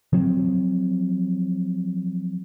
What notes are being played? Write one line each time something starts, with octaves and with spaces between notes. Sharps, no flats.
F3 F#3 C4